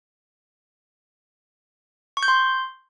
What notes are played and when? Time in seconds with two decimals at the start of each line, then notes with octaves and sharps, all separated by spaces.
2.17 C#6
2.23 G6
2.28 C6